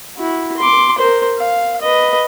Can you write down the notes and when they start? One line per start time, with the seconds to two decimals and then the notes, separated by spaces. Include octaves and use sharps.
0.17 E4 F#4
0.57 C6 D6
0.98 A#4 C5
1.37 F5
1.81 B4 D#5